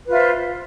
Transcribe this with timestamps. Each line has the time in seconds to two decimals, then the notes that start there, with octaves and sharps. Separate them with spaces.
0.06 B4
0.09 F4
0.13 E5
0.16 C5